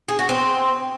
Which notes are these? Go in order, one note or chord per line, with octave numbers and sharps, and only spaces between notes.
G#4
F#4
C4